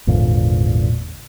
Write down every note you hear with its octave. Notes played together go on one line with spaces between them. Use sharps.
G#1 E2 A#2 D3